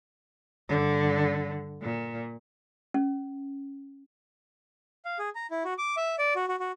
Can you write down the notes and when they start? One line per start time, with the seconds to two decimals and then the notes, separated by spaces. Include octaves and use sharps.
0.68 G2 D3
1.81 A#2
2.94 C#4
5.05 F5
5.19 G#4
5.35 A#5
5.51 E4
5.65 F#4
5.78 D6
5.97 E5
6.19 D5
6.36 F#4
6.48 F#4
6.60 F#4